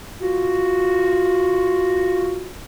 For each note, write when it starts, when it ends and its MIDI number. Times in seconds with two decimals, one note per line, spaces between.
0.21 2.52 65
0.21 2.52 66